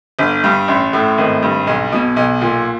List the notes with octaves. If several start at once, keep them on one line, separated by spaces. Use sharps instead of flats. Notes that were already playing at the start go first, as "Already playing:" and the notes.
G1
G2
A1
A2
G#1
G2
B1
B2
B1
A#2